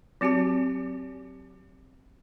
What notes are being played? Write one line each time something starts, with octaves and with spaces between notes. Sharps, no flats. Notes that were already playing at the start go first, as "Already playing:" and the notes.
F#3 C4 F#4 G4 A5